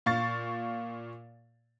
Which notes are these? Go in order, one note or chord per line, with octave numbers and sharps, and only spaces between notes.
A#2 F5 C#6 A6